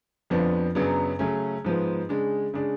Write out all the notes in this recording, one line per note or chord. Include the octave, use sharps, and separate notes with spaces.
F2 F3 B3 D4
F#2 C#3 F#3 B3 D4
C#3 F#3 A3 C#4
G#2 F3 B3
C#3 G#3 D4
C#3 G#3 D4